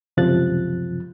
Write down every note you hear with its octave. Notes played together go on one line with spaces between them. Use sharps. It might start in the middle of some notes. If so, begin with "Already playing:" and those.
C#2 F#2 C3 F3 F#6 A6